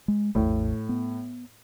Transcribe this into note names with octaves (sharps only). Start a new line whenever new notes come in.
G#3
A1 E2 A2
B3